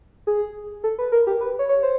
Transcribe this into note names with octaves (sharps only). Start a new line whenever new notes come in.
G#4
A4
B4
A#4
G4
B4
C#5
C#5
C5